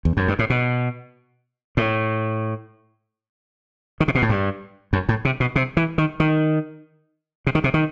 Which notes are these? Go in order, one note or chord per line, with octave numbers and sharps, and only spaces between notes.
E2
F#2
G2
A2
B2
A2
D#3
C3
B2
A2
G2
F#2
A2
C3
B2
C3
E3
D#3
D#3
C3
D#3
C3
D#3